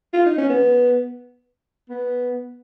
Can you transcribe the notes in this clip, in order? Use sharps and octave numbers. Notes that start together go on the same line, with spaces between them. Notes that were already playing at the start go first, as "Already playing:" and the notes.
F4
D#4
C#4
B3
B3